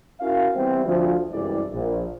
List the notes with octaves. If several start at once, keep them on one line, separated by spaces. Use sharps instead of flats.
C#4 E4 F#4 A#4 F5
E3 G3 B3 C4
D2 F3
F#1 C2 G2 E3 G#3 D5
A#1